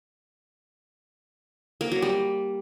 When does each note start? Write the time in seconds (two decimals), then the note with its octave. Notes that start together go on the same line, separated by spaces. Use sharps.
1.81 A#3
1.92 F#3
2.02 G3